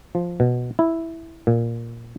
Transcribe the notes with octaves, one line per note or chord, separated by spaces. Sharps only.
F3
B2
E4
A#2